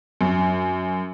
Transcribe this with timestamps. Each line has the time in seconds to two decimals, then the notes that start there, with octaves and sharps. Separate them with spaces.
0.21 F#2